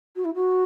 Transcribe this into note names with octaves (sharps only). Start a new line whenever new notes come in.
F#4
E4
F#4